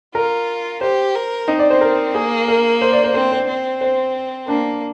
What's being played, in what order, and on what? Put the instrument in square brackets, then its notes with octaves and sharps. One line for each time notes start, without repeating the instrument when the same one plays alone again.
[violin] F4 [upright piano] A#4
[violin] G4 [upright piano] C5
[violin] A#4
[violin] C4 [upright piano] D#4
[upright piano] D5
C5
A#4
[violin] A#3 [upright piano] G#4
[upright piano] A#4
C5
D5
C5
[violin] C4 [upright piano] C5
[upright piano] C5
[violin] C4
[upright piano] C5
[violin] A#3 [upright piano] D4